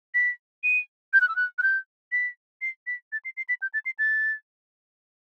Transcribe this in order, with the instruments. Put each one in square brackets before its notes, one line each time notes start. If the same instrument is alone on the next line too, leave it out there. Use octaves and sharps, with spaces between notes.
[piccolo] B6
D#7
G6
F#6
E6
F#6
F#6
G6
B6
C7
B6
A6
C7
C7
B6
G6
A6
C7
A6